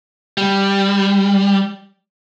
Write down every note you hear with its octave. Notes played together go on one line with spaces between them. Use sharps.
G3